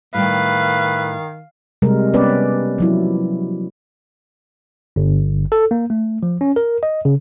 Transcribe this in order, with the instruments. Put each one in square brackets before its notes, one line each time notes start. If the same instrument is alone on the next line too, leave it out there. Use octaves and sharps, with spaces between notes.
[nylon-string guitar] A2 G3 G5 [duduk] D#3 [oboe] B4 [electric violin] F5
[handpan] C3 G3 G#3 A#4
B3 C#4 G4 B4 D5
F3 F#3 E4
[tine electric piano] G1
A4
A#3
A3
F3
C#4
A#4
D#5
C#3